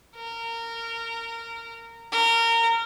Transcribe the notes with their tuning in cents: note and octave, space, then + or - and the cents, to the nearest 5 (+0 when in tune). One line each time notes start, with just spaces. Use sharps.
A#4 -20
A#4 -20